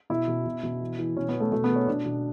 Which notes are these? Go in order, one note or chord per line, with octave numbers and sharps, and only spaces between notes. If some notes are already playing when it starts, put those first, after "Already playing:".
B2 E4
B2
B2
B2
E3
E3
B2 C#4
B3
B2
A3
B2 A3
B3
B2
C#4
B2 D4
B2